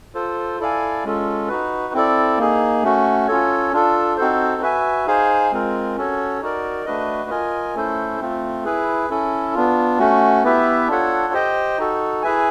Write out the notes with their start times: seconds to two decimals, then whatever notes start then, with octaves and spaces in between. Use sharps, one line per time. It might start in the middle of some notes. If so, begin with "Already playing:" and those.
0.15 F4 A4 C5
0.59 E4 A4 D5 F5 G#5
1.04 G#3 C#4 F4 A4
1.48 D#4 F#4 B4
1.94 C4 E4 A4 D5
2.38 A#3 D#4 G#4
2.83 A3 C#4 F#4
3.28 C#4 F4 A4 C#5
3.73 D4 F4 A4
4.17 C4 D#4 F#4 A4 C5
4.62 F#4 B4 E5 G#5
5.07 D#4 G#4 C5 F5 G#5
5.52 G#3 C4 F4 A#4
5.96 C#4 F#4 A4 C#5
6.41 D#4 F#4 A#4 D5
6.86 A3 D4 F#4 B4 D#5
7.30 F4 A#4 D#5 G#5
7.75 A3 C#4 E4 A4 C5
8.20 A3 C4 F4
8.65 E4 G#4 B4
9.10 C#4 E4 A4
9.54 B3 D4 F4
9.99 A3 C#4 F#4
10.43 B3 E4 G4 B4 E5
10.88 D4 F4 A4 C#5 F#5
11.33 G4 C5 D#5 G5
11.78 D#4 F#4 A4
12.22 E4 G#4 B4 E5 G#5